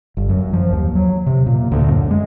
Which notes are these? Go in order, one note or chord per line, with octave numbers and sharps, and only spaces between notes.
G1
F#2
F3
D#2
F#3
C3
A#2
D2
F#2
G#3